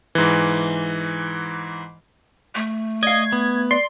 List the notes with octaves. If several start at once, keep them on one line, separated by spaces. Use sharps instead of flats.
G#2 E3
A3
D5 D#5 F5 G#6
B3
D5 C6